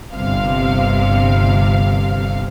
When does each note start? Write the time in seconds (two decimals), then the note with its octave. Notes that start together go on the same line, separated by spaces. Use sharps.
0.14 G1 C3 F5